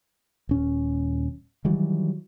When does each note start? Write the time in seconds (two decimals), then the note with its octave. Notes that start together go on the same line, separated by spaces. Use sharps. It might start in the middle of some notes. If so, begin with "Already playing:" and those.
0.49 D#1 C#4
1.65 D#3 E3 F#3 G3